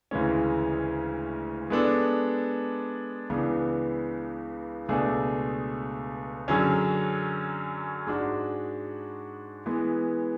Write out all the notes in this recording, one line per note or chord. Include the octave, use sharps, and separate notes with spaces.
D2 C#3 E3 G#3 C#4
G#3 B3 D4 A4
C#2 C#3 E3 B3 D4
C#2 B2 A3 D4 G#4
F#2 D3 F#3 C#4 G#4
G#2 G#3 D4 F#4
E3 G#3 B3